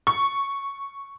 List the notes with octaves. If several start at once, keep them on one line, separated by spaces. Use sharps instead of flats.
C#6